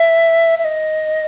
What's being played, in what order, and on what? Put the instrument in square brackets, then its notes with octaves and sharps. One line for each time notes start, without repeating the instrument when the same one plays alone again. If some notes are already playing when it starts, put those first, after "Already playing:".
Already playing: [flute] E5
E5
D#5